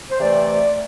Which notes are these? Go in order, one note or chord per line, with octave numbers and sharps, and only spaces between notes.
C5
C3 E3 A3 C4 D5